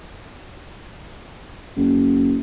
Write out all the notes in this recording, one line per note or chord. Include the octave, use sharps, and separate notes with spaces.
F#1